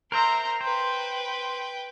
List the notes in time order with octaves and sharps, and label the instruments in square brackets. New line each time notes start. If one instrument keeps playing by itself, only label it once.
[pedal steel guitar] A#4 C5 E5 [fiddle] A#5 C6
[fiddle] B4 G5 [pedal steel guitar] C5